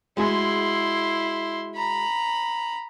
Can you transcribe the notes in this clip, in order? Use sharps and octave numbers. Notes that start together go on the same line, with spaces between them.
G#3 E4 F#4 G#4 C6
A#5 B5